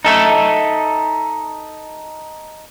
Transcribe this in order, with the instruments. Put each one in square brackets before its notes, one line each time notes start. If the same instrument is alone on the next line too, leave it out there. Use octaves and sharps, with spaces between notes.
[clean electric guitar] D#4 A4 E5